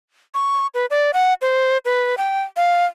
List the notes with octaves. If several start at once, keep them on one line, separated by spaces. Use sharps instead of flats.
C#6
B4
D5
F#5
C5
B4
G5
F5